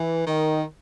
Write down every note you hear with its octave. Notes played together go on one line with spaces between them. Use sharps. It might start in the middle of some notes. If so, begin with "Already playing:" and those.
Already playing: E3
D#3